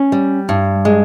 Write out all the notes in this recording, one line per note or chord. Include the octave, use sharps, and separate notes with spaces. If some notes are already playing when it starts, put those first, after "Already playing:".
Already playing: C#4
G3
G2
G#3